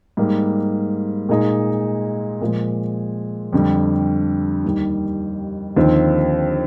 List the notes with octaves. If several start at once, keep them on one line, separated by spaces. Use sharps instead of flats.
G#2 G3 A#3
A#2 G#3 D#4 G#4
A#2 F3 G#3
F2 D3 G3
D#2 D#3 G3
D#2 D3 F3 C4 D#4